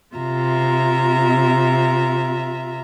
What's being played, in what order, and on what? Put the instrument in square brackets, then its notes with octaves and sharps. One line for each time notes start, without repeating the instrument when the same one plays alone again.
[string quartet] C3 F4 E5 A#5